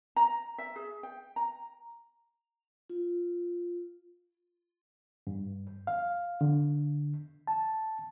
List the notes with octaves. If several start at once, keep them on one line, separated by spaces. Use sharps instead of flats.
A#5
E5
G#4
G5
A#5
F4
G2
F5
D3
A5